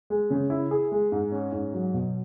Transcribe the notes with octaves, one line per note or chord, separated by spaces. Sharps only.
G#3
C#3
E4
G#4
G#3
G#2
C#4
G#2
F#3
B2